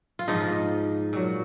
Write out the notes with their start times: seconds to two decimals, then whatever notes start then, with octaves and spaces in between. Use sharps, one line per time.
0.19 F4
0.28 G#2 F3 D#4
1.13 A#2 F#3